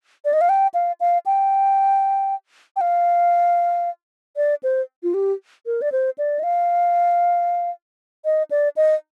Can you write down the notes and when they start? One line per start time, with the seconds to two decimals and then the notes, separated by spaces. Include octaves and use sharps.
0.25 D5
0.33 D#5
0.41 F5
0.49 G5
0.74 F5
1.00 F5
1.26 G5
2.76 G5
2.81 F5
4.37 D5
4.63 C5
5.03 F4
5.14 G4
5.66 A#4
5.82 D5
5.92 C5
6.18 D5
6.39 D#5
6.43 F5
8.25 D#5
8.51 D5
8.77 D#5